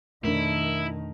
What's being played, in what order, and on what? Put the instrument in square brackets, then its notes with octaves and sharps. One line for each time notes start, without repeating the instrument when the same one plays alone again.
[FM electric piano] F2 B2 A#4 [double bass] D#3 [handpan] A3 D4 [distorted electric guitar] E4